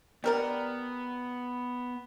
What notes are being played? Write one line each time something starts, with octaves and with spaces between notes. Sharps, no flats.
G3 B3 A#4 D5